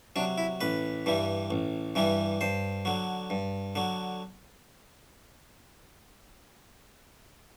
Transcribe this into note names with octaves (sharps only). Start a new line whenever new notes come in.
C3 F#3 D4
E4
A1 B4
G2 E3 G3
A1
G2 E3 G3
G2 C5
D3 F#3
G2
D3 F#3